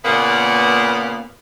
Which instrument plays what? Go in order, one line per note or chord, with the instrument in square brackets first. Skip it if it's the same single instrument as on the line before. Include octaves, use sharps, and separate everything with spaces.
[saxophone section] A#2 C#3 A#3 B3